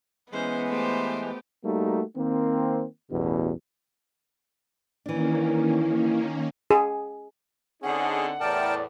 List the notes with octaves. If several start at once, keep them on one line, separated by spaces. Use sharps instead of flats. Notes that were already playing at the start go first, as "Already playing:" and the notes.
E3 G#3 B3 C#4 C5
A3 G4 C5
G3 A3 A#3 D#4 F#4
D#3 A#3 C4
A1 E2 G2 B2
D#3 E3 A#3 C#4 D4
G#4
D3 C4 C#4 D#4 G#4 F#5
E2 A2 A#4 D5 G5 A5